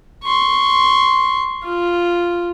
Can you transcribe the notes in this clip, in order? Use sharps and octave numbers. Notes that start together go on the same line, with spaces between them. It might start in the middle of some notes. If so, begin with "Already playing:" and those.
C6 C#6
F4